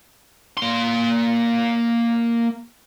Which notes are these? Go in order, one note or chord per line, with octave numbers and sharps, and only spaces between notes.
A#3 C6